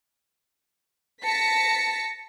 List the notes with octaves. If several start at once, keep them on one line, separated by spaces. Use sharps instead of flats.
A5 A#6 B6 C#7